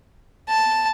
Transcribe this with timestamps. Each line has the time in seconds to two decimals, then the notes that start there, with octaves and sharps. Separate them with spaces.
0.49 A5